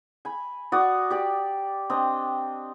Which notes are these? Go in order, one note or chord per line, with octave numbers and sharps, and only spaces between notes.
G#5 B5
F#4 D5 D#6
G4 D5
C4 D4 D#5